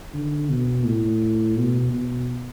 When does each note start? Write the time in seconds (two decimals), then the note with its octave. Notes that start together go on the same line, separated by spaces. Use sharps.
0.14 D3
0.50 B2
0.86 A2
1.58 B2
1.93 B2